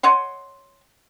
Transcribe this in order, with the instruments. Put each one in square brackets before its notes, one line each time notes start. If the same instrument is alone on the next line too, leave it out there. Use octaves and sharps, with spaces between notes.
[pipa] C#5 D#5 F#5 C6